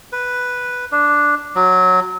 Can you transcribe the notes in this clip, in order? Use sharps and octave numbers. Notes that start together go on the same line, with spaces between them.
B4
D4
F#3